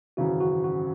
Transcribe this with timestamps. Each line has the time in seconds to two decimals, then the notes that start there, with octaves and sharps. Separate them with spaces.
0.17 G#1 F#2 C#3 E3 F#4
0.40 F#4
0.64 F#4